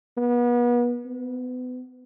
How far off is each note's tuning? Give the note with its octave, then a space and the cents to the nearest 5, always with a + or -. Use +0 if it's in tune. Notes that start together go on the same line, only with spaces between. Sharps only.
B3 -35
B3 +30